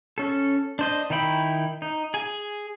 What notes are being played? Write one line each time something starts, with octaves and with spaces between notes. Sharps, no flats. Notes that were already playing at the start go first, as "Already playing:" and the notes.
C#4 A4
D4 C5 D#5
D#3 D#4 E4 G5 B5
D#4
G#4 G#5